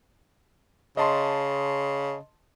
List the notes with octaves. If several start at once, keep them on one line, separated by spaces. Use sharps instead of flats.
C#3 D#5 A5 C6